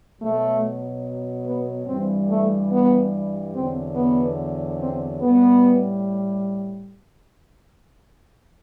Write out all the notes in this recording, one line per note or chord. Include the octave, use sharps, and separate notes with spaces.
B2 F#3 A3
B3
G2 E3 G3 C4
A3
B3
E2 D3 F#3 C4
B3
C4
A2 G3 B3